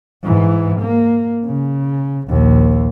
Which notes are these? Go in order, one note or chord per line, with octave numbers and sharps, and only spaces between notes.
G#2 E3
A#3
C#3
A#1 D#2